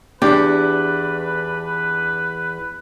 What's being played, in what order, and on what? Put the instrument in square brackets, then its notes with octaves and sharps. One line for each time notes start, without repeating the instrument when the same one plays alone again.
[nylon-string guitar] E2 [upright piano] D4 [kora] G4 [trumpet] B4